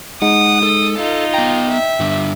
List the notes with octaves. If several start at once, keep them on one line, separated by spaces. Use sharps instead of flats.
G#3 D#4 F#5 D#6
A4
D#4 F4
B3 G5 A#5
E5
G2 D3